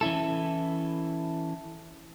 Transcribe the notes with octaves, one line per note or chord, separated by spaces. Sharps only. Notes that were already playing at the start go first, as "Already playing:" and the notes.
E3 C#4 E4 A4